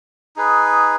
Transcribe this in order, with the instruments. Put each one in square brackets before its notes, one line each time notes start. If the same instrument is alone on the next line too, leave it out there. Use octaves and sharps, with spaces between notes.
[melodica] D#4 G#4 B4